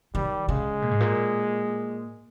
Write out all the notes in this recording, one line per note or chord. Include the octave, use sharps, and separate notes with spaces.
D#3 G3
C#3 G#3
A#2
G#2
A#2